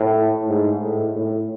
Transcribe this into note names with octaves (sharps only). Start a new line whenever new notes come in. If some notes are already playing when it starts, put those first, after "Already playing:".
Already playing: A2
G#2
A2
A2